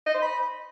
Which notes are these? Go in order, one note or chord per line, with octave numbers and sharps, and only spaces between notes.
D#5
C5
B5